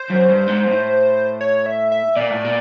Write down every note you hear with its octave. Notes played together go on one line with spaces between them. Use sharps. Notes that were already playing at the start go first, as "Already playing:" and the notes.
Already playing: C5
F#2
G2
G#2
A2
C#5
E5
E5
A#2 D5
A2
A#2